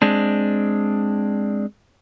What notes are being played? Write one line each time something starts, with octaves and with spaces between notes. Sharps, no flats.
G#3 C4 D4